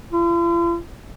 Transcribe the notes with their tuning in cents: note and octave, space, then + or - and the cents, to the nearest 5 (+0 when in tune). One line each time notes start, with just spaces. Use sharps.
F4 -45